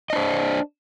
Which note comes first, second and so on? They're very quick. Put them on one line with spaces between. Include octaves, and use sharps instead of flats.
D#5 D4 C5